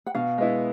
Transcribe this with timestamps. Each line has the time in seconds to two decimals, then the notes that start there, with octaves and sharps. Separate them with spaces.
0.06 F#5
0.15 B2 F5
0.38 G#3 B3 E4